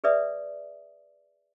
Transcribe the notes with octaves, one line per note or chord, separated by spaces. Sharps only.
G#4 B4 D5 E5 D#6